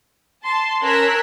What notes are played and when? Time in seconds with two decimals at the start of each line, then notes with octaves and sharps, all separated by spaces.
0.44 A5 C6
0.83 C#4 A#4 E6 F#6 G#6 B6